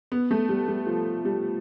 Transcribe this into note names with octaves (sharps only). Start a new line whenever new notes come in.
B3
A3
G3
G3
F3
G3